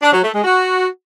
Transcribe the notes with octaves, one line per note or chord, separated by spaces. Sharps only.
D4
F#3
A3
G#3
F#4